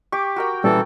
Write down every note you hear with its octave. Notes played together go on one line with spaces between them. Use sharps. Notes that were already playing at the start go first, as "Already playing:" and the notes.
G4 C#6 D6
F#4 A#4 G5
A#2 E3 G3 C#4 A4